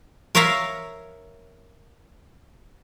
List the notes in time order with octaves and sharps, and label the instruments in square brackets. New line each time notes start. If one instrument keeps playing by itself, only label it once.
[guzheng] A#4 C#5 E5 F5 A#5